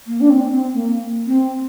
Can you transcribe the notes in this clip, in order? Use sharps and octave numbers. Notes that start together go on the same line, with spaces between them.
A#3
D4
C4
C4
A#3
C4